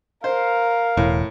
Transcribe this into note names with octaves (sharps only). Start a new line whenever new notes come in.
A#4 C5 F5
E1 A2